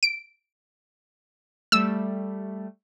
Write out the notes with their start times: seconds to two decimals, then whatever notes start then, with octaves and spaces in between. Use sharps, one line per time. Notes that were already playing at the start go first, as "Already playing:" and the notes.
0.03 D7
1.72 G3 A3 E6